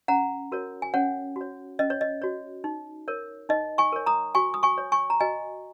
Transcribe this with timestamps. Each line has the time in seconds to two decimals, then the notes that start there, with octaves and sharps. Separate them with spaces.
0.08 C#4 F#5 A#5
0.52 F#4 A#4 C#5
0.82 G#5
0.94 C#4 C#5 F#5
1.36 F#4 C#5
1.79 C#4 D#5
1.90 C#5
2.01 D#5
2.22 F#4 C#5
2.64 D#4
3.08 A#4 C#5
3.49 D#4 D#5
3.78 G#5 C#6
3.92 A#4 C#5
4.06 A#5 D#6
4.35 F#4 G#5 C#6
4.54 D#6
4.63 G#5 C#6
4.78 C#5
4.92 G#5 C#6
5.10 A#5
5.20 F#4 D#5 G#5